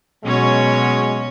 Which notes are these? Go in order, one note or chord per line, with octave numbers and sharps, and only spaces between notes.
B2 F#3 G#3 C#4 C#5